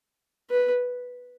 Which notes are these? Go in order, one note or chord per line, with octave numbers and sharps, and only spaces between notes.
B4